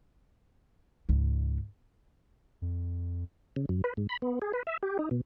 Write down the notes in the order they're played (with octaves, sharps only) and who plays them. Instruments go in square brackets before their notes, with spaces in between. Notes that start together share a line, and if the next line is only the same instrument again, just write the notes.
[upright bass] C#2 G#2
[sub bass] F2
[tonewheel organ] C#3
F#2
B4
G#2
B5
B3
G#4
B4
E5
G4
D#4
B2